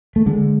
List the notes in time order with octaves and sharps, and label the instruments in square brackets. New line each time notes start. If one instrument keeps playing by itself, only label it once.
[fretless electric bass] A3
D3 G#3